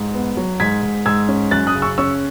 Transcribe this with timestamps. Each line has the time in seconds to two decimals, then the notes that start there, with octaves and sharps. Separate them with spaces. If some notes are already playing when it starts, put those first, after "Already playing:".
Already playing: G#2
0.14 B3
0.37 F#3
0.60 G#2 G#6 B6
0.83 G#2
1.06 G#2 E6 G#6
1.29 C#4
1.51 F#2 F#6 A6
1.67 D#6 F#6
1.75 C#3
1.82 C#6 E6
1.98 C#4 C#6 E6